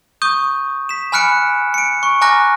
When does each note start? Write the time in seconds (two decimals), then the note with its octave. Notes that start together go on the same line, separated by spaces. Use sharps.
0.22 C#6 D#6 G6 D#7
0.89 B6 E7
1.12 G#5 B5 F6 F#6 C#7 D7
1.74 C#7 D7
2.03 C#6
2.21 G#5 A#5 D6 F6 F#6 A#6